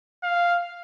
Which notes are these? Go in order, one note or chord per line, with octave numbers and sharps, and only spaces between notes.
F5